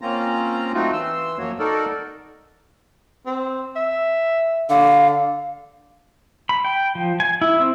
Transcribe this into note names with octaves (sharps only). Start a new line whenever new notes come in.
A#3 C4 C#4 F4 A#5
F#3 A3 C4 D#4 F4 F#4
E3 C6 E6
F#2 F3 A#3 F#4 C#5
D#4 F#4 A4 A#4 D5
C4
E5
D3 F5
B5
G5
F3
G#5
E4
C4